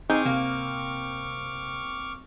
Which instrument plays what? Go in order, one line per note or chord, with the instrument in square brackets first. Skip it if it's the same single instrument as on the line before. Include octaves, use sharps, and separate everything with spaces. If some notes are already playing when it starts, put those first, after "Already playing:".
[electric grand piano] C4 [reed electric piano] D#4 G6 [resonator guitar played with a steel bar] G#4 [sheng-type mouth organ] C#6 D6 F6
[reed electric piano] C3 [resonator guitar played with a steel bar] A#3